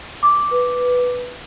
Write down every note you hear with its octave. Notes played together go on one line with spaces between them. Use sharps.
D6
B4